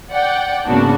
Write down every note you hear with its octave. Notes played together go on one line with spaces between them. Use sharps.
D5 F#5 G5
G#2 C#3 A#3 B3 D4 F#4